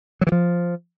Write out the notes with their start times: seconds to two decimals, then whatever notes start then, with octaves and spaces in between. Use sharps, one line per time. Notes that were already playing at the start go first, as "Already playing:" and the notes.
0.21 F#3
0.27 E3
0.32 F3